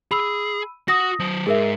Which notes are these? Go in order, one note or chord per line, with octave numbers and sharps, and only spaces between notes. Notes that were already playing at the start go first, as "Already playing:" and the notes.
G#4 B5 E6
F#4 F#5 D#6 A#6
F#3 C5
G#2 G#4 A#4 E5